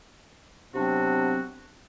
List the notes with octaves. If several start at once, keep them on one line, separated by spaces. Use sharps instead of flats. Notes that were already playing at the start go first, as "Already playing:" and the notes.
C3 F#3 B3 C4 D4 F#4